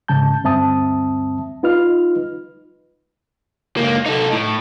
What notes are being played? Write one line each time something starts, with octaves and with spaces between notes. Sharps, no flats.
G#2 C#3 A5 G6
D2 G2 C4 E5 A5 D#6
D#4 F4 B4 D#5 F6
C#2 A#3
D#4 A4
A2